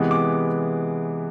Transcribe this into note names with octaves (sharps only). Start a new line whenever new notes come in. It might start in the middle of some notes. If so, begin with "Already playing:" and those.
Already playing: C3 E3 G#3 B3
D6